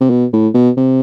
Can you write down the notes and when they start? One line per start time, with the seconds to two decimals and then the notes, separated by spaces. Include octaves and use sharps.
0.01 C3
0.10 B2
0.33 A2
0.54 B2
0.77 C3